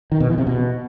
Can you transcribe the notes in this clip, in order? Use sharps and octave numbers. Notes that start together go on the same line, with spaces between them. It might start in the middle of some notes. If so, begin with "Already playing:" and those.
D#3
B2
E3
C3
B2